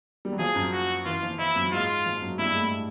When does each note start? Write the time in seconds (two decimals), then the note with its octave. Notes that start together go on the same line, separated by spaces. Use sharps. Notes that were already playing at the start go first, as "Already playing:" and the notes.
0.25 G3
0.32 F#3
0.39 F3 G#4
0.55 F#2 F#3
0.72 F#4
1.05 E3 F4
1.23 F3
1.39 F3 E4
1.56 F#2 F#3
1.72 G#2 G#3 F4
2.06 F3
2.22 F#2 F#3
2.39 G2 G3 E4
2.49 G#3
2.55 A2 A3